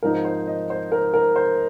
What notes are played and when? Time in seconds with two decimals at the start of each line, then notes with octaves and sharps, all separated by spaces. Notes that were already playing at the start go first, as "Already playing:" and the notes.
0.03 G#2 F3 C4 D#4 A#4
0.25 C5
0.47 D#5
0.70 C5
0.92 A#4
1.14 A#4
1.36 C5